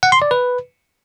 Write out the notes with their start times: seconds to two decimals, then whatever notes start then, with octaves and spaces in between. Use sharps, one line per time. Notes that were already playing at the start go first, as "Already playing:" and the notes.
0.03 F#5
0.12 C6
0.22 D5
0.31 B4